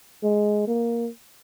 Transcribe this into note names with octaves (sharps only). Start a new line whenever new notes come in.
G#3
A#3